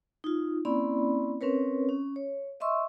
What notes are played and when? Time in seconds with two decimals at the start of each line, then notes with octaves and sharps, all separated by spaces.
0.24 D#4 F4
0.65 A#3 C4 C#4 E4 D5 B5
1.41 C4 C#4 A#4 B4 C#5
1.89 C#4
2.16 C#5
2.60 D#5 E5 C6 C#6 E6